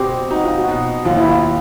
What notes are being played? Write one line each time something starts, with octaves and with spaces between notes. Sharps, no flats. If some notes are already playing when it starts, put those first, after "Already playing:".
Already playing: B2 C4 G4
D#4 F#4
F4
F#4
B2
D#2 F4
E4
F4